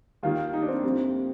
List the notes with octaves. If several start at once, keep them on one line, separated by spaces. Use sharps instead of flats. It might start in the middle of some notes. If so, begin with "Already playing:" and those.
D#2 D#3 G3 A#3 F4
D#4
D4
C4
F2 C3 G3 A#3